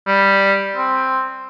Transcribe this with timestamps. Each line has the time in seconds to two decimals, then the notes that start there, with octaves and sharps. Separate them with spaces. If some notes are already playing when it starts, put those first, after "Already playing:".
0.07 G3
0.76 C4